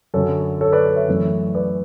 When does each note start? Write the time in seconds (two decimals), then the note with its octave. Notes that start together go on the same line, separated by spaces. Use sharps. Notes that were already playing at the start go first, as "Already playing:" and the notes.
0.14 F#2 D3 F#3 A4 C#5
0.61 A4 C#5
0.72 B4 D5
0.96 C#5 E5
1.08 F#2 E3 A3
1.55 B4 D5